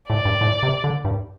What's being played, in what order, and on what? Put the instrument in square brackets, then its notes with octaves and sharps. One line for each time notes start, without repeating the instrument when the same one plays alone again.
[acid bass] A2 [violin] D5
[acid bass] G2
A2
C3
D3
G2